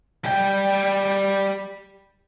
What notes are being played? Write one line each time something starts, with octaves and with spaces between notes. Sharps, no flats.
G3 G5